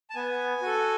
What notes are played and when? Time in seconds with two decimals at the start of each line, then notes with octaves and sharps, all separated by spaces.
0.10 A5
0.15 B3 G#5
0.62 F#4 A4